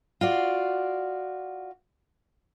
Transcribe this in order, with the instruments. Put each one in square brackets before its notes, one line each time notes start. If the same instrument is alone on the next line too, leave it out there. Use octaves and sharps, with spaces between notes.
[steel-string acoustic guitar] F4 F#4 D5